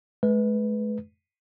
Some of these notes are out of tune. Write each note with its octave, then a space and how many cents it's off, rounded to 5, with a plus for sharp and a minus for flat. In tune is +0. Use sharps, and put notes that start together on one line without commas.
G#3 +45 B4 +0